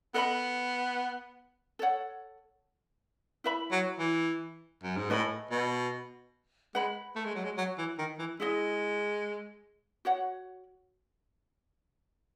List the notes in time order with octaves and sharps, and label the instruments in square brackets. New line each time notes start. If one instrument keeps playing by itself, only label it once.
[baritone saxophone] B3 [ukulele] A4 D#5 F#5 B5
[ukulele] A4 C#5 F#5
E4 B4 E5 B5
[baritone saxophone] F#3
E3
F#2
G#2
[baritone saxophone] A2 [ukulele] B4 D#5 G#5 B5
[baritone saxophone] B2
[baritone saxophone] G#3 [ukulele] B4 F#5 B5
[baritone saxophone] A3
G#3
F#3
G#3
F#3
E3
D#3
E3
[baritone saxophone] G#3 [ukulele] E4 G#4 D#5
[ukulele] F#4 C#5 F#5